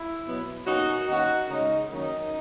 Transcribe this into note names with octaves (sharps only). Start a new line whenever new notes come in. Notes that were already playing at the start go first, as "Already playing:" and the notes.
Already playing: E4
B2 F#3 B3
B2 A#3 C#4 D#4 F#4
D#3 A#3 C#4 D#4 F#4
C#3 G#3 C#4 D#4
D#3 F#3 A#3 C#4 D#4